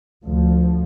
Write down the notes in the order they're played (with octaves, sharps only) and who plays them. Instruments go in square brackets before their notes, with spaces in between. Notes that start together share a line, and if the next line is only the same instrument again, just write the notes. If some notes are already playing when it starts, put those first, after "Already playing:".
[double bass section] D2 F3